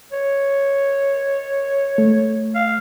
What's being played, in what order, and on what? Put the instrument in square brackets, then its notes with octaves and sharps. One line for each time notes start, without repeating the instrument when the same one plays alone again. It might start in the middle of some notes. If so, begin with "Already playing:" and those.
[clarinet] C#5
[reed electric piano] A3
[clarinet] F5